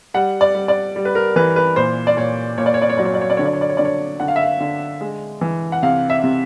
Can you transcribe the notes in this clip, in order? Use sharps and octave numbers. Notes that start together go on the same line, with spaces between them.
G3 F#5
D5
G3
D5
G3
B4
A#4
E3 B4
B4
A#2 C5
D5
A#2 C#5
A#2 C#5
D5
C#5
D5
C#5
F#3 D5
C#5
D5
C#5
D5
D3 C#5
D5
C#5
D5
C#5
D3 D5
C#5
D3 F#5
F5
E5
F5
D3
G#3
E3
F#5
C3 F5
E5
C3